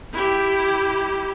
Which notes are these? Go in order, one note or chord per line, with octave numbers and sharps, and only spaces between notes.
E4 G4